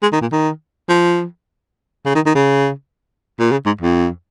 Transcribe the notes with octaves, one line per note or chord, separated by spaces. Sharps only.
G#3
D#3
A#2
D#3
F3
C#3
D#3
D#3
C#3
A#2
C#3
G#2
F2